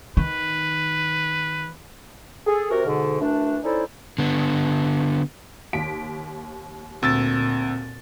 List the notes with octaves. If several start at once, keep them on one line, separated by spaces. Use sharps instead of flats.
D#3 B4
G#4 A4
C3 F#4 A#4
G#2 B2 D3
F#2 E3 A3 D4
C#4 D#4 E4 A4 C5 D5
D3 B3
D#2 B6 D7
D2 A#2 C4 E6 A6